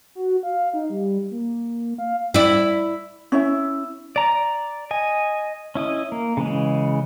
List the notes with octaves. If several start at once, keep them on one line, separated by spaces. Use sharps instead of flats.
F#4
F5
D#4
G3
A#3
F5
E4 D5
C#4 E4 E5
D5 A#5
D#5 G#5
C#4 E4 D#5
A#3
C#3 E3 G#3